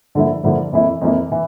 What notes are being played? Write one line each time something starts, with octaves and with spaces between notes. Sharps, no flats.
G2 D3 F3 A#3 E4
G2 D3 F3 A#3 E4
F2 E3 A#3 E4
F2 E3 A#3 E4
E3